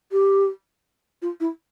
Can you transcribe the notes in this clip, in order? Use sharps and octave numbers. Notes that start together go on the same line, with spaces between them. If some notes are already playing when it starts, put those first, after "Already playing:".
G4
F4
E4